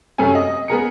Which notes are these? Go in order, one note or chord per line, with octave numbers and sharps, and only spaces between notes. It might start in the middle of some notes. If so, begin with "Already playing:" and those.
F#2 C3 A3 C#4 G#5
D#5
B3 G#4 A#4 C#7